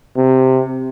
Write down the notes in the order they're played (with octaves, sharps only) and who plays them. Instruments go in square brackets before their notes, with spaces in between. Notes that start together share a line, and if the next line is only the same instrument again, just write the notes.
[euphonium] C3